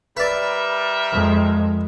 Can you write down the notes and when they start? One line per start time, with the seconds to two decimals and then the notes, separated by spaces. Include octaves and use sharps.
0.17 G3 A#4 B4 D5 E5
1.13 F2 G#3